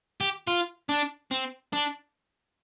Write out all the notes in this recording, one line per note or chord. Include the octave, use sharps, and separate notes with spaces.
G4
F4
D4
C4
D4